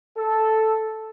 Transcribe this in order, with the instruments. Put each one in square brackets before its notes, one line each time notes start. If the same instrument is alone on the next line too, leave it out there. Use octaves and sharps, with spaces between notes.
[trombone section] A4